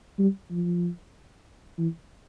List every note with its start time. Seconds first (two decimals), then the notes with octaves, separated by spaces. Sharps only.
0.19 G3
0.51 F3
1.78 E3